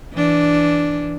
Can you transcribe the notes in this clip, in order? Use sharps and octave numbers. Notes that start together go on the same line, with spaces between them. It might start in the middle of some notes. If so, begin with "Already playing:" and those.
E3 D4